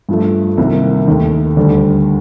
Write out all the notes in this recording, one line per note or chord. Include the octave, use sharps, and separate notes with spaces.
G2 F3 A3
C2 C3 D#3 A#3
D#2 D#3 A3
D2 D3 G3 D4